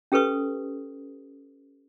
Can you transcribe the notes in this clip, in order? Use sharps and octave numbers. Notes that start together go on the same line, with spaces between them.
C#4 G4 A4 B4 C#6 D#6